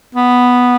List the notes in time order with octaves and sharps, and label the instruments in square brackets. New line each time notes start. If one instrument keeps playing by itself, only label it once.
[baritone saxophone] B3